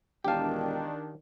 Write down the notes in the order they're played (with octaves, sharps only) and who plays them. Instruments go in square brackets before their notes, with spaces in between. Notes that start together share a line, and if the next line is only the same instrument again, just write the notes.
[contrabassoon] E1 [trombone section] D#3 D4 [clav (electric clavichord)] G4 F5 [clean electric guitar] G5 A5